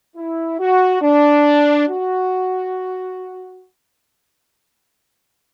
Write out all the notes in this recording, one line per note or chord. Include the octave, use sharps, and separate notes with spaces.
E4
F#4
D4
F#4